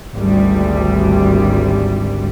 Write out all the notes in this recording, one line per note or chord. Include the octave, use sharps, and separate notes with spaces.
G#1 D2 G3